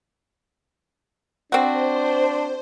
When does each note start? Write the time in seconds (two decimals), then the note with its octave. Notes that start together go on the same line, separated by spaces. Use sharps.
1.52 C4 D4 F#4 C5